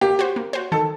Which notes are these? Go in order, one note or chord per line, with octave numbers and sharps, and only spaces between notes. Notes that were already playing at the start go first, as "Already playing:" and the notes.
A#3 G4
F#4 C5
A#3
F#4 C5
D#3 A4